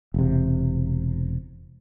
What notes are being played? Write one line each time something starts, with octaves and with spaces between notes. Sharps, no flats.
E1 C3